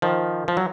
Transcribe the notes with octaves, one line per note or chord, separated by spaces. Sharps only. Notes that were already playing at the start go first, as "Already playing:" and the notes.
D#3 F3
F3
F#3